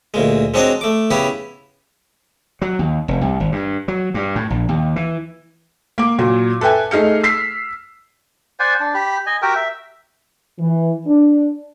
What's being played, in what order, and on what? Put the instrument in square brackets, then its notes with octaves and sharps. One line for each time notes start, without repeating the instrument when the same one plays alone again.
[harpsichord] D2 A#2 G#3
G#3 C4 D4 F#4 C#5 D#5
A3 D6
C#3 B3 E4 G4 C#5
[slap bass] F#3
D#2
F1
C2
G#1
G2
F#3
G2
A2
A#1
D#2
E3
[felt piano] A#3 D6
A#2 F#3
A4 B4 E5 G5 G#5
A3 D#4 G#4 F6 C#7
E6 B6 C7
[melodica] C5 D5 F#5 G#5
D4
G4 B5
D#5 G#5
F#4 G4 A#4 G5
E5
[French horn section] E3
D4